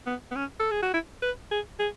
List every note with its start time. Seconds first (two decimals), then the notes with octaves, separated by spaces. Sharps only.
0.07 B3
0.31 B3
0.36 C#4
0.60 A4
0.71 G#4
0.82 F#4
0.94 E4
1.22 B4
1.51 G#4
1.79 G#4